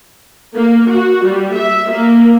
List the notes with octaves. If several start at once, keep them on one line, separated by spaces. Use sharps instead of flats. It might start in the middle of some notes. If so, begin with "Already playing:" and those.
A#3
F#4
G3
E5
A#3